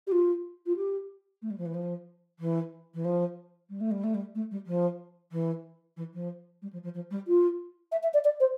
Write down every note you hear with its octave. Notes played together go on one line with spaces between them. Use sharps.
G4
F4
F4
G4
A3
G3
F3
E3
F3
E3
E3
F3
G3
A3
G3
A3
G3
A3
G3
F3
E3
E3
F3
G3
F3
F3
F3
G3
F4
E5
E5
D5
D5
C5